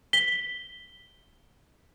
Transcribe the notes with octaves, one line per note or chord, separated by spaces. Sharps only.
B6 G7